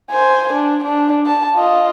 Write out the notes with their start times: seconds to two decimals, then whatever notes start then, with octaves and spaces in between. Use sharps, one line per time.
0.11 C5 G#5
0.53 D4
0.84 D4
1.26 A5
1.56 F4 D#5